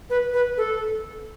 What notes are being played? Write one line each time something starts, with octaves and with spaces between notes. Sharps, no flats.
B4
B4
A4